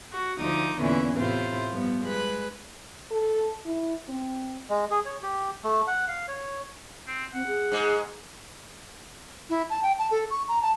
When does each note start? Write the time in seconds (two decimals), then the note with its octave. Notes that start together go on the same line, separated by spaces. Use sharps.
0.10 F#4
0.39 D2 F3 D#4 D6 D#6
0.79 E2 A#2 D3 E3 C#4 E4
1.15 A2 C3 E4 F4 C5
1.70 G2 F3 B3
2.05 G#3 B4 F#6
3.11 A4
3.65 E4
4.09 C4
4.69 G#3
4.91 G#4
5.06 C#5
5.23 G4
5.64 A3
5.87 F#5
6.08 F5
6.28 C#5
7.07 C4
7.34 C4 F#5
7.47 G#4
7.72 G#2 G#3
9.50 E4
9.70 A5
9.83 G5
9.99 A5
10.11 A4
10.30 C#6
10.48 A#5
10.62 A5